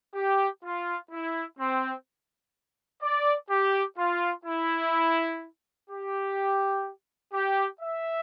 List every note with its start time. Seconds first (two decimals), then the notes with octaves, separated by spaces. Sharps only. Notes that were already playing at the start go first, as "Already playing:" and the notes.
0.15 G4
0.64 F4
1.11 E4
1.59 C4
3.02 D5
3.50 G4
3.98 F4
4.46 E4
5.90 G4
7.33 G4
7.81 E5